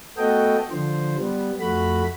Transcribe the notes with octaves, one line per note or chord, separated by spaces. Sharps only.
A3 B3 F#4 A4 D#5 G5
D3 F3 C5
G3 B3
F2 A3 F#4 B5